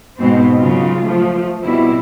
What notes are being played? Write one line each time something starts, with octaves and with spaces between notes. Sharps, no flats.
G#2 B2 C4
C#3 F#3 F4
F3 A3
B2 G3 C4 E4